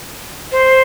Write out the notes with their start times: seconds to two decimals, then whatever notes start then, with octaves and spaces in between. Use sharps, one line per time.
0.52 C5